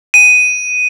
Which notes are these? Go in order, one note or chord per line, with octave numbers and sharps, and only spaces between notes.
D#7